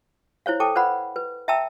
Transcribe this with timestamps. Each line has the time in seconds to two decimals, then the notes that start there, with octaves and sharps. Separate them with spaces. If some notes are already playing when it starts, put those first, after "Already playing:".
0.46 E4 C5 C#5 F5
0.60 A4 G5 A5 D6
0.75 B4 C5 D5 F5 F#5 B5
1.16 B4
1.48 E5 G5 A5 A#5 E6